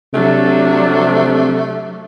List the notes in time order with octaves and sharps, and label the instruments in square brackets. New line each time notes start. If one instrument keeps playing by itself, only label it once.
[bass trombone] C3 [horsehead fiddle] F#3 D4 [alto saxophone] A3